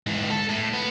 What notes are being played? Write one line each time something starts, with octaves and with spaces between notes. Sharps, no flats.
G#2 E3
A4
A2
B3